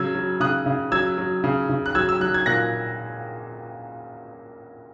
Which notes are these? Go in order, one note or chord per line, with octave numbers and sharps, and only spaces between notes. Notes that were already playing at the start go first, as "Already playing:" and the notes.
Already playing: C#3 F#3 E6 G#6
F#3
C#3 D#6 F#6
C#3
F#3 E6 G#6
F#3
C#3
C#3
F#6
F#3 E6 G#6
E6
F#3 F#6
G#6
A#2 F#6 A#6